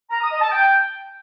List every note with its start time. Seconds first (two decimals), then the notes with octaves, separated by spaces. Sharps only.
0.11 A#5
0.21 D#6
0.31 D#5
0.41 A5
0.52 G5